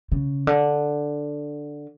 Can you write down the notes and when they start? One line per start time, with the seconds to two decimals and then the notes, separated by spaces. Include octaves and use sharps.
0.12 C#3
0.47 D3